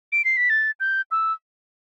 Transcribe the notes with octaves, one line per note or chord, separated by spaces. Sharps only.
D7
C7
B6
A6
G6
E6